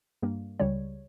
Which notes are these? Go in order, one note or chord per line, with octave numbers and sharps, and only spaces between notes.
G2 G3 A#3
C#2 C#3 G3 C#5